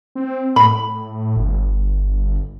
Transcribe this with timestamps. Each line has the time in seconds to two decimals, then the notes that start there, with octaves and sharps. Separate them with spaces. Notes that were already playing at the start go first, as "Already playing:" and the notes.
0.15 C4
0.56 A2 B5
1.36 G1